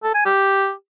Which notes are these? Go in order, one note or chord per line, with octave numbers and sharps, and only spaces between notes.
A4
G#5
G4